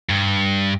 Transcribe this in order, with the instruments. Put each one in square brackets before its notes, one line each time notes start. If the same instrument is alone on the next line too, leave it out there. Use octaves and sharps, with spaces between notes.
[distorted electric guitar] G2